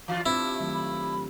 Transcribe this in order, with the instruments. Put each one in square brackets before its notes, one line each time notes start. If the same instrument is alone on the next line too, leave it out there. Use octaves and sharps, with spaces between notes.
[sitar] E3 F4 [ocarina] F5
[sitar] G2 [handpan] C4 F4 C5 [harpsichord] E4 [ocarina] E5
[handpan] D#3 F#3 A3
[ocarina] B5